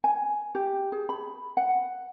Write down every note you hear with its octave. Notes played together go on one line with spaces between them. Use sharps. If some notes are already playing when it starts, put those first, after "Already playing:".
G#5
G4
G#4
B5
F#5